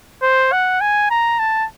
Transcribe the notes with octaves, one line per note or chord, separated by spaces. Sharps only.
C5
F#5
G#5
A#5
A5